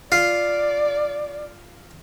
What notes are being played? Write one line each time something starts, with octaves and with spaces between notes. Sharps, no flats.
F4 D5